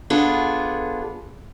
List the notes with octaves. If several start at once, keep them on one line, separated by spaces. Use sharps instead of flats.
B3 D4 F4 G#4 A4